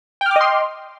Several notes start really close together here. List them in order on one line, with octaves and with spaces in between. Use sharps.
G5 F6 D6 D#5 C6